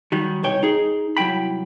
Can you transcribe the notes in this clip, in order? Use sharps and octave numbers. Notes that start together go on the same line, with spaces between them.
D#3 F#3 G3
C2 B2 C#5 G5
D#4 G#4
C2 F#3 E4 G5 B5